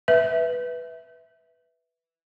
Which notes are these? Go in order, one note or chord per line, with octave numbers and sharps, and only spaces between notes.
B4 E5